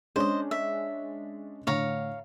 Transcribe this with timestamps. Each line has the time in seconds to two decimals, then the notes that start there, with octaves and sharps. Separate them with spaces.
0.16 G#3 C#4 D4 C5 D#5
0.51 E5
1.67 A2 D3 C#5 F5 A#5